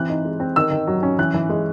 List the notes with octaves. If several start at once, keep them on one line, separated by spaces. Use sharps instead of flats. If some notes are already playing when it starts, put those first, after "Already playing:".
Already playing: E3 C4 F#6
D#4
G#3
C4
D#3 E6
D#3
F#3
C#4
E3 F#6
E3
G#3